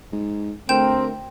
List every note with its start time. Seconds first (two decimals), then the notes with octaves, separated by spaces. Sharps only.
0.12 G#2
0.69 D2 A3 C4 A#4 G5 G6 E7